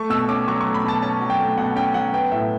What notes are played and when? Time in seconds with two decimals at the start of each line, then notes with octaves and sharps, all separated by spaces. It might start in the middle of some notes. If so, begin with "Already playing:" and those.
Already playing: A3 C#6
0.10 B2 E6
0.29 C#4 D6
0.48 F#3 C#6
0.61 A3 C#6
0.74 B5
0.84 B2 A5
1.02 C#4 A5
1.21 F#3
1.30 G5
1.39 A3
1.58 B2 F#5
1.76 C#4 G5
1.94 F#3 F#5
2.13 B3 G5
2.32 A2 E5